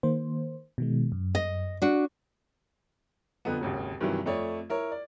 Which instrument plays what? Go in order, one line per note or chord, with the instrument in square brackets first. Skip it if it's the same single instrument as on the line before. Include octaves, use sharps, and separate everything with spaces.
[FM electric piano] D#3 A#3 C5
B2 D#3 G#3
F#2
[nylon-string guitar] D#5
D4 F#4
[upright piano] F2 D3 B3
G#1 D#2 C#3
G2 C3 D#3 E3 F#3
F2 A3 C#5 D5
E4 A#4 C#5
D5